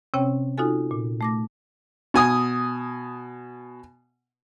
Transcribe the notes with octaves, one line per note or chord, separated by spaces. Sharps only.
C3 C4 C#4 C#5 G5
D#4 F4 F#4 A4 G#5
A#2
A3 D6 A#6
B2 G#5 D#6